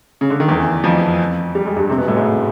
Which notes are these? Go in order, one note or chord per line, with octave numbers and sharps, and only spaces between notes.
C#3
D3
D#3
E2 E3
F2 F3
G3
G#3
G2 G3
C3 C4
B2 B3
A2 A3
G#2 G#3